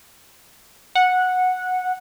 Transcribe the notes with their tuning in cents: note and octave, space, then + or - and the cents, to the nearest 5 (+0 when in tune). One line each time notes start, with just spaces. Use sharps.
F#5 -10